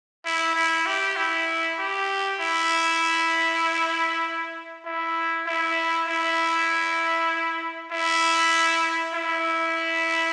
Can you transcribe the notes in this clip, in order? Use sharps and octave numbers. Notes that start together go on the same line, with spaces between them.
E4
E4
G4
E4
G4
E4
E4
E4
E4
E4
E4